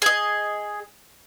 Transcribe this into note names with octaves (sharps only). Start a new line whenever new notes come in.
G#4 D#5